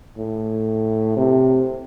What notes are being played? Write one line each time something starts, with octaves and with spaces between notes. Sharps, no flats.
A2
C3